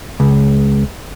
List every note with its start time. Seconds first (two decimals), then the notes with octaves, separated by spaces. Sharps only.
0.20 C#2